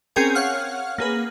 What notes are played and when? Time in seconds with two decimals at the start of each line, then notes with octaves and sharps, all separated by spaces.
0.16 C4 C#4 G#4 A#4 G5 G#5
0.35 C#5 F5 F#5 F6
0.98 A#3 G#4 B4